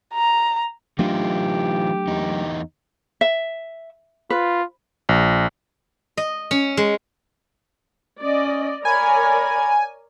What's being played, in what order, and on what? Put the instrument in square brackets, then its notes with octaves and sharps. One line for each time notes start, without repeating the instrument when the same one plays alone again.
[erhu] A#5
[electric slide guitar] E3 D#4 F4 [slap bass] F#3 A3 D4 [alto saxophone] G4
[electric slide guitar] E2 D#4
[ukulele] E5
[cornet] F4 [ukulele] B4
[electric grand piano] A#1
[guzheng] D#5
C#4
G#3
[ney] C#4 [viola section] D5 D#5
[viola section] A#4 C#5 D5 [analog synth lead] G#5 [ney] B5